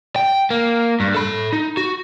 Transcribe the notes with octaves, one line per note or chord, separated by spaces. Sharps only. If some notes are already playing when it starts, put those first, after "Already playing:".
G5
A#3
G2
A4 B5
D#4
F#4